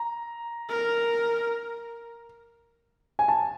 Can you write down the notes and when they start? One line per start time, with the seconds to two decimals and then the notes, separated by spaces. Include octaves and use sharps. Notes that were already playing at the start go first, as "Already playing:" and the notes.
Already playing: A#5
0.69 A#4
3.19 G#5
3.28 A5